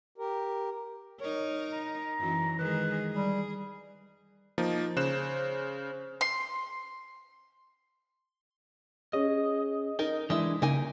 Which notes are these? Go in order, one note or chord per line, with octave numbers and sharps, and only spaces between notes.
G4 A#4
D#4 A#4 C#5
A#5
F#2 E3 F#3
D#3 G#3 G#4 B4
G3 G#4
F3 A#3 D#4
C#3 C5 F#6 E7
C6
C#4 G#4 D#5
D#4 A#4 G7
E3 G#3 D4 E4 D#6
C#3 A#3 D#4 G#5